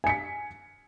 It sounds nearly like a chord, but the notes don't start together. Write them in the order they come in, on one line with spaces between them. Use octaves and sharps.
G#5 C#7 B6